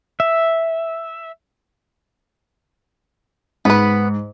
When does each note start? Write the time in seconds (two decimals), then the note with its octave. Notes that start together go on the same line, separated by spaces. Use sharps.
0.20 E5
3.65 G#2 B3 B4